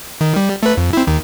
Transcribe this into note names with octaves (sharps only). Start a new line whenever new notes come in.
D#3
G3
A3 B4
F2
C4 E4
D#2 D#3